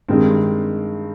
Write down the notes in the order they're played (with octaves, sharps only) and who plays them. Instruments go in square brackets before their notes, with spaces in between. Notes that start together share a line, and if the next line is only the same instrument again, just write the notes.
[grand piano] G2 D#3 G#3 C4